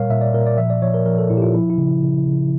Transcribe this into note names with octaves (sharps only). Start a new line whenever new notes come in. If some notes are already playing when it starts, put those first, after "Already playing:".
Already playing: A#2 G3 A#4 C#5 F5
A#2 E5
D5
A#2 A#4
D5
F3 E5
D5
F3 C#5
A#4
F3 A#4
A4
A#2 E4
G4
F4
F3 E4
E4
C#3
C#3
C#3